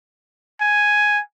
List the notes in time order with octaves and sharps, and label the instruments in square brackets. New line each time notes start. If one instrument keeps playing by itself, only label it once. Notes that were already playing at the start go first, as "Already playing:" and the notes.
[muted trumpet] G#5